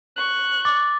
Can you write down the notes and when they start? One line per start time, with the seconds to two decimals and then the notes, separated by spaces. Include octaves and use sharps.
0.17 C#6 F#6
0.65 D6 A6